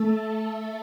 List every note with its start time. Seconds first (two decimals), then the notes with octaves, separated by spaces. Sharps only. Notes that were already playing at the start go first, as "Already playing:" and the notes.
Already playing: A3 A4